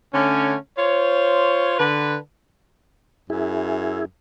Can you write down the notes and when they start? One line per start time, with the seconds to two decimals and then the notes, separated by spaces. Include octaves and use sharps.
0.14 D3 A3 C#4
0.77 F4 C5 C#5
1.78 D3 B4
3.30 F#2 E4 G#4